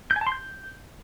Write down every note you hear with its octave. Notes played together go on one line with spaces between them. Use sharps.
G6
G#5
A5
C6
G6